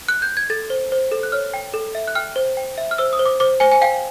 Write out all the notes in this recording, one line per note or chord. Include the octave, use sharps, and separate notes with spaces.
F#6
G6
G#6
A4 A6
C5
C5
A4
F#6
C#5 F6
G5
A4
E5
F#6
G5 F6
C5
G5
E5
F6
C5 E6
D#6
C5
D6
C5 D6
C5 G#5
G#5
F5 G5